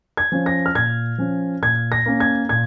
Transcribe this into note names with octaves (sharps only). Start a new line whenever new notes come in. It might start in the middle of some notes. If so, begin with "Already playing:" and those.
G#6
F3 C#4
A#6
F6
A#2 G#6
F3 C#4
A#2 G#6
A#6
A#3 C#4
G#6
A#2 G#6